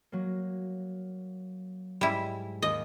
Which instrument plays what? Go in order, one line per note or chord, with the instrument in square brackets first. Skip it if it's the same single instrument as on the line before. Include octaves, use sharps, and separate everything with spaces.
[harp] F#3 A#3
[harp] G#2 [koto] G3 E4
[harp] D#2 [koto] D#5